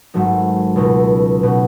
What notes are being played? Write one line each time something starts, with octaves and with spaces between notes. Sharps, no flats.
G#1 G#2 F#3 A3 D#4
C#2 B2 A3 D#4
B2 A3 D#4